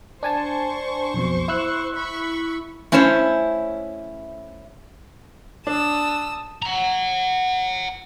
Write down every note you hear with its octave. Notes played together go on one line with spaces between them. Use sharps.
D4 C5 G#5 A5 C#6
B1 F2 B2
E4 E6 F#6
B5 C#6
A3 C#4 E4 C5 C#5
D4 A5 D#6 E6
F#5 A#5